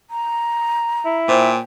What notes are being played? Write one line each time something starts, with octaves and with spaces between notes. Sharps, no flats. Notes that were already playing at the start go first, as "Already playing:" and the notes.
A#5
E4
A#2 C5 C#5 G5 G#5